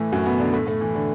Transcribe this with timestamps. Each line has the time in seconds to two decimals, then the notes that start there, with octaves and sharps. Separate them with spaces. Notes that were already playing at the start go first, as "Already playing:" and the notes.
Already playing: A2 E3 A3 E4
0.12 F#2 F#3
0.26 B2 B3
0.40 D3 D4
0.53 A2 A3
0.67 A2 A3
0.81 E3
0.95 D3